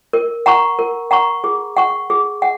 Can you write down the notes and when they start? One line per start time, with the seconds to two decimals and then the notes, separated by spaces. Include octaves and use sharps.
0.13 A#4
0.46 F#5 A#5 C#6
0.79 A#4
1.11 F#5 A#5 C#6
1.44 G#4
1.77 F#5 C#6
2.10 G#4
2.42 F#5